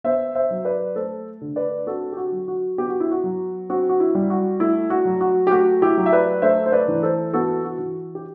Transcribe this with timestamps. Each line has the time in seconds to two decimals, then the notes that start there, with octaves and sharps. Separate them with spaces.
0.04 B3 C5 E5
0.35 C5 E5
0.51 F#3
0.65 B4 D5
0.96 A3 A4 C5
1.41 D3
1.56 B4 D5
1.87 C4 F#4 A4
2.13 G4
2.17 F#4
2.32 F#3
2.48 F#4
2.78 B3 G4
2.89 F#4
3.00 E4
3.11 F#4
3.24 F#3
3.69 C4 F#4
3.89 F#4
4.00 E4
4.15 G3
4.30 F#4
4.60 A3 E4
4.90 F#4
5.05 F#3
5.21 F#4
5.47 G4
5.51 A3 F#4
5.82 E4 G4
5.97 F#3
6.06 E5
6.12 B4 D5
6.42 A3 C5 E5
6.66 C5
6.72 B4 D5
6.88 E3
7.03 A4 C5
7.33 B3 F#4 A4
7.64 F#4
7.79 E3
8.15 G4